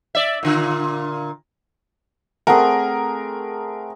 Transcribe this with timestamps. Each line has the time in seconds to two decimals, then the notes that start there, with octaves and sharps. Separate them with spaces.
0.15 D5 E5
0.43 A#2 D3 F4
2.47 A3 C4 G#4 A#4 F#5